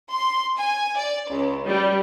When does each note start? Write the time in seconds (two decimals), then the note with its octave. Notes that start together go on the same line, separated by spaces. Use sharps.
0.11 C6
0.57 G#5
0.97 D5
1.30 C#2
1.65 G3